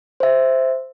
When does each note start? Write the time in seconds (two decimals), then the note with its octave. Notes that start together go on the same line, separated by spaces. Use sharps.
0.20 C5 E5